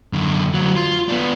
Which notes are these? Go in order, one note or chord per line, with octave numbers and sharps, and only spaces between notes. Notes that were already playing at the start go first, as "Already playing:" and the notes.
F#2 D3
D2 F#3
F4
B3 D4